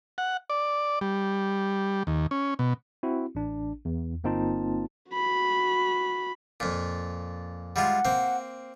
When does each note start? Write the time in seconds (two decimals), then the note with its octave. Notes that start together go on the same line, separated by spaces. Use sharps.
0.18 F#5
0.50 D5
1.01 G3
2.07 D#2
2.31 C#4
2.59 B2
3.03 C4 E4 F#4
3.35 A1 D4
3.85 E2
4.24 G1 A#3 C4 D#4 F4 A5
5.13 F#4 B5
6.60 F2 A#2
7.76 G3 G#3 F4 F#5
8.05 A#3 C4